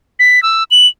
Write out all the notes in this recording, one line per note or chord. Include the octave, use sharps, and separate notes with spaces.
B6
E6
F#7